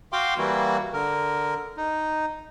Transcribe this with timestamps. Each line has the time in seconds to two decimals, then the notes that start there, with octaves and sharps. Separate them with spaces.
0.13 F#4 F5 G5 C6 D6
0.38 E3 G3 A#3 E4 F#4
0.93 D3 A#4
1.77 D#4